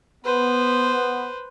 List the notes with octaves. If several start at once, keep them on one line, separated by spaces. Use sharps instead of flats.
B3 B4 C5